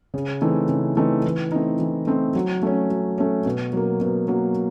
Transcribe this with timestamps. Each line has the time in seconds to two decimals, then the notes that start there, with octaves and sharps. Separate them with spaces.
0.14 C#3
0.41 E3 A3 C4 D#4
0.69 C#3
0.97 E3 A3 C4 D#4
1.24 E3
1.52 A3 C4 D#4
1.79 E3
2.07 A3 C4 D#4
2.35 F#3
2.63 A3 C#4
2.90 F#3
3.18 A3 C#4
3.46 B2
3.73 F#3 A#3
4.01 B2
4.28 F#3 A#3